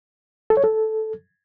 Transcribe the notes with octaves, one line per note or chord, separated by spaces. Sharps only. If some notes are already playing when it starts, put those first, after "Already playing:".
A4
C#5
A4